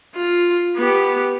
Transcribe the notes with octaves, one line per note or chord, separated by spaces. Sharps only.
F4
B3 G4